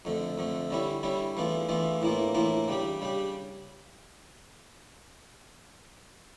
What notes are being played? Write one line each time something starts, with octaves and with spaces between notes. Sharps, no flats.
F2 D3 A3
F2 D3 A3
D3 G3 C#4 E4
D3 G3 C#4 E4
E2 E3 A3 D4 F4
E2 E3 A3 D4 F4
A2 E3 A#3 D4 F4
A2 E3 A#3 D4 F4
C#3 G3 D4 G4
C#3 G3 D4 G4